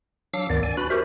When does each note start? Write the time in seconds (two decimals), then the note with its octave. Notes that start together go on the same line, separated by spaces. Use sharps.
0.34 F#3 D4 F5 D6 E6
0.50 D2 G2 D#3 B3 D5 A6
0.63 D5 G#5
0.77 D4 F#4 B4 B5
0.90 F#4 G4 A#4 C5 E5